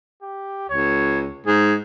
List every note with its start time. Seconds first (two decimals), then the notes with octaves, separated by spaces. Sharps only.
0.22 G4
0.69 C#2 C#5
1.47 G#2 G#4